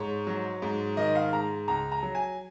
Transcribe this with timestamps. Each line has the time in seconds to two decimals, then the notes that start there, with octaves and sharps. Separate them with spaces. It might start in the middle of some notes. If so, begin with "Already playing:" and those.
Already playing: G#2 C#5
0.27 F#3
0.62 G#2
0.97 D#3 D#5
1.15 F5
1.33 G#2 A#5
1.68 C#2 A#5
1.92 A#5
2.03 F#3
2.15 G#5